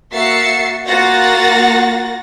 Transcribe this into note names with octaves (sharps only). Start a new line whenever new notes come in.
A#3 F#4 E5 A6 C7 C#7
A#3 F4 F#4 F#5 A6 A#6